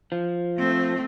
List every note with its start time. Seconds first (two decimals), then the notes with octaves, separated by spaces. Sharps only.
0.12 F3
0.58 A3 C4